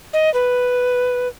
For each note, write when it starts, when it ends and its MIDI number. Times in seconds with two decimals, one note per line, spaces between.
0.13 0.32 75
0.34 1.28 71